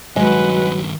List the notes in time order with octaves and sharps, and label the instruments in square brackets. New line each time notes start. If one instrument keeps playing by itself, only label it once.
[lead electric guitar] G2 D#3 [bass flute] F#3 [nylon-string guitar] G#3 [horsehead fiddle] B4 F#5